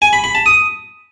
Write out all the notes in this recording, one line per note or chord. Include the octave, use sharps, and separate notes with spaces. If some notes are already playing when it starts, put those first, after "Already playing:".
G#5
B5
B5
A5
D#6